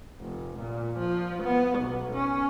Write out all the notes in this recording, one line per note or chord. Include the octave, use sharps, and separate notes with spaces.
F1
A#2
F3
B3
B1
C#4